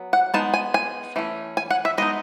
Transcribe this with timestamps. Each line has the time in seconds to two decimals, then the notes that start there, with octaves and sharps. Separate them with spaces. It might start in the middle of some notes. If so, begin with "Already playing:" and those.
Already playing: F#3 B3
0.13 F#5
0.34 G#3 B3 D#4 A5
0.54 G#5
0.74 G#5
1.16 E3 A3 C#4
1.57 G#5
1.70 F#5
1.85 E5
1.98 G#3 B3 D#4 D#5